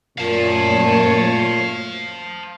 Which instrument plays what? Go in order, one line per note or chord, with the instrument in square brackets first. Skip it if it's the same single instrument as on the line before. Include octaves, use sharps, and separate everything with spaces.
[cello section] F#2 A3 C#5 [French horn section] A#2 [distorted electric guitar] F5 A5